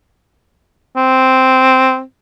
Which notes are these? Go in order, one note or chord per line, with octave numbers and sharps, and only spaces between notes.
C4